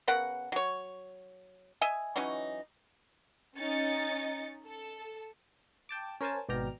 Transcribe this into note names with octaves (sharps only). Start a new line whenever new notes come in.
C#3 B3 A#4 F#5
F#3 C#5
D#5 E5 G#5
E3 F#3 C#4 D#4
C#4 D#4 A6 C#7
A4
G5 A5 D6
C#4 A#4 C5 G#5 A5
G#1 B2 D5 G5 A#5 F6